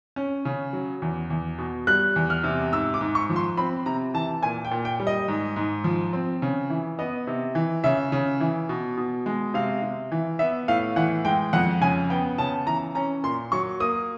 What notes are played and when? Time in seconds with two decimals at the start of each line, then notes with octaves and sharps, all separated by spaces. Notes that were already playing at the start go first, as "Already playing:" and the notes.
0.16 C#4
0.45 C#3
0.73 F#3
1.02 E2
1.30 E2
1.58 B2
1.87 G3 F#6
2.16 E2
2.30 F6
2.44 C3
2.72 G#2 E6
2.94 D6
3.01 G#2
3.15 C#6
3.30 F3
3.36 C6
3.57 C4 B5
3.86 C3 A#5
4.14 E3 A5
4.43 A#2 G#5
4.65 G5
4.71 A#2
4.85 G5
5.00 G3
5.07 D#5
5.28 G#2
5.56 G#2
5.84 F3
6.13 C4
6.42 C#3
6.70 E3
6.99 B3 D#5
7.27 C3
7.55 E3
7.84 C#3 E5
8.12 C#3
8.40 E3
8.69 B2
8.97 B2
9.26 G#3
9.54 C3 F5
9.82 C3
10.12 E3
10.39 B3 E5
10.68 A2 F5
10.96 E3 F#5
11.25 G#3 G5
11.53 F2 F#5
11.81 C#3 G#5
12.10 B3 G5
12.38 C#3 A5
12.67 E3 A#5
12.95 C#4 A#5
13.23 A#2 C6
13.52 F#3 C#6
13.80 A#3 D#6